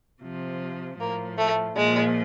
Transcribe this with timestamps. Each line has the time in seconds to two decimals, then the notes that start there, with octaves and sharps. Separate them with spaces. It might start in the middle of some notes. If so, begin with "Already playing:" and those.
0.23 C3 F3
0.99 A2 F3 A#3
1.37 A3
1.75 A#2 F3 G#3